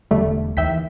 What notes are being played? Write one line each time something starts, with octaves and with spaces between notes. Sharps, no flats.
E1 D3 G3 A3
D#2 E3 E5 G5 B6